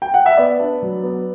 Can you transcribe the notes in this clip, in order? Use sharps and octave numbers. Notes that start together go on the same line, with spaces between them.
G5
F#5
E5
B3 D5
D4
F#3
B3